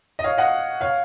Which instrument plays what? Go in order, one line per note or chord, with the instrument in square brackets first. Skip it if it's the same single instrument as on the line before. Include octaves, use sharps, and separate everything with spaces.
[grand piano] D#5
C#5 F5
D#5 F#5
C#5 F5